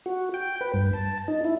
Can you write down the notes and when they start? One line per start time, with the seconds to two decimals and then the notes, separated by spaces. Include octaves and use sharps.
0.06 F#4
0.34 G5
0.61 B4
0.74 G2
0.93 A5
1.28 D#4
1.44 E4